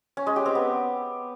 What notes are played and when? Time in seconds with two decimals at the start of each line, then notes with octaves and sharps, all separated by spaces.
0.17 C#4
0.27 G#3
0.36 G4
0.46 C4
0.55 B3